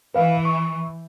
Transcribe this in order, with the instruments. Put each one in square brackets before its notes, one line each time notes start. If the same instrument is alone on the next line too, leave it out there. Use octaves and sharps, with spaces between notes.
[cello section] E3 [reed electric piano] B4 F5
[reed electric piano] C#6